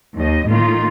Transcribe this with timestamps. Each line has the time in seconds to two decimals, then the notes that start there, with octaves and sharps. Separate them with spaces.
0.17 D#2 D#5
0.48 A2 D#3 A#3 F4